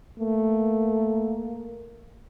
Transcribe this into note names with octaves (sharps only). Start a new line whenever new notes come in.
A3 A#3